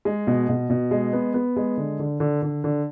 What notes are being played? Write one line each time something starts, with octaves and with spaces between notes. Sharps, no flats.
G#3
B2
B2
B2
G#3
B3
B3
G#3
D3
D3
D3
D3
D3